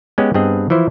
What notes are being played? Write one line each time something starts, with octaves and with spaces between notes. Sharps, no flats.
G#3 B3 C#4 G4
G2 B3 C4 G#4 D#5
E3 F3 E4 C5